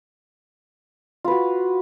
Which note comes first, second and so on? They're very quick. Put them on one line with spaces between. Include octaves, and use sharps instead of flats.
F4 B4 F#4